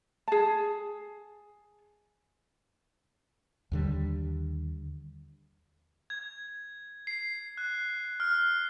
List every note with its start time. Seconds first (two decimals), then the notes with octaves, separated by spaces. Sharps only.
0.28 G#4 A5
3.72 D#2 D3 G3
6.10 G#6
7.07 C7
7.58 F#6
8.20 F6